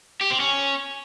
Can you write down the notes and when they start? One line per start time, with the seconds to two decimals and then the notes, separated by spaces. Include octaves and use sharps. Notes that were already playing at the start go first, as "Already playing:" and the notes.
0.21 G4
0.30 C4
0.40 C#4